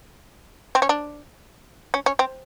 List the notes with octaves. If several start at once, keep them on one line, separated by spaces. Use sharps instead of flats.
C4
C#4
D4
C#4
C#4
C4